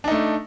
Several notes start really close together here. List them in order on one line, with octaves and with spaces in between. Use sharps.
D4 D#4 A3